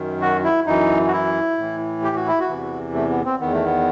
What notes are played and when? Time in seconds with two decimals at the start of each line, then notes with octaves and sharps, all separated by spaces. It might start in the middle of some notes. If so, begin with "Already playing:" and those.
Already playing: F#2 D#3
0.21 F#4
0.44 E4
0.66 F#2 E3 D#4
1.08 F#4
1.13 E4
1.58 A2 E3
2.03 G4
2.16 F#4
2.27 E4
2.40 F#4
2.49 E2 C3 E3
2.94 A3
3.10 B3
3.25 C4
3.40 E2 D#3 B3
3.53 A3
3.65 B3